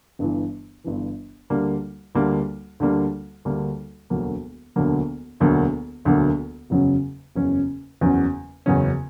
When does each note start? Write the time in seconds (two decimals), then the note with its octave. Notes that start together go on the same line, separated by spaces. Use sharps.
0.19 G1 G2 E3
0.84 G1 G2 E3
1.50 D2 D3 G3 A#3
2.15 D2 D3 G3 A#3
2.80 D2 D3 G3 A#3
3.45 D2 D3 G3 A#3
4.10 E1 D2 D3 F#3 A#3
4.76 E1 D2 D3 F#3 A#3
5.40 E1 D2 D3 F#3 A#3
6.05 E1 D2 D3 F#3 A#3
6.70 F#1 E2 C#3 F#3 C#4
7.36 F#1 E2 C#3 F#3 C#4
8.01 F#1 E2 C#3 F#3 C#4
8.66 F#1 E2 C#3 F#3 C#4